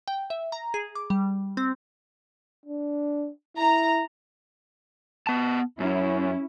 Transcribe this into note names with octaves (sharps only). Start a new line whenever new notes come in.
G5
E5
A#5
G#4
D6
G3
C4
D4
E4 A#5
B3 A5
F#2 C#4 E4